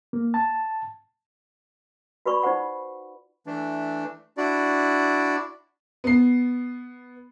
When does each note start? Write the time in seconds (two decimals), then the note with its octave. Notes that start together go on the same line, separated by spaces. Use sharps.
0.13 A#3
0.34 A5
2.26 F#4 B4 D5 B5 C#6
2.42 D#4 F4 C5 F#5 C#6
3.47 E3 A3 D4
4.37 D4 E4 F#4 D5
6.04 B3 C7